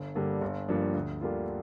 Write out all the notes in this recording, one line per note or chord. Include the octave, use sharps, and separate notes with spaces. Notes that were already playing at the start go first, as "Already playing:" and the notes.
Already playing: G1
G2 D3 G3 A#3
G1
G2 F3 A#3 D4
D2
D3 G3 A#3 F4